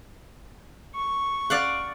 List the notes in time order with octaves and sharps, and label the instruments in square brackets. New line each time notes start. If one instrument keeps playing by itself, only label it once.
[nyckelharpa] C#6
[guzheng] D5 F5 F#5